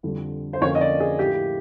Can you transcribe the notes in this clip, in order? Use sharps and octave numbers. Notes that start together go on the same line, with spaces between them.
F2 D3 G3
C5
F2 D3 F3 A#3 C#4 C#5
D#5
D5
G#4
A2 F3 A#3 G4